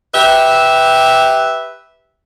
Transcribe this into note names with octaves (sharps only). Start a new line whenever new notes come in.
G4 B4 E5